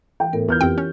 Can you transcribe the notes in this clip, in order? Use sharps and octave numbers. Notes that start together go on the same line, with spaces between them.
E3 G5
A2 B3 A#4
E2 E3 B3 E4 F4 F6 G6
F2 C4 G4 G5
C#4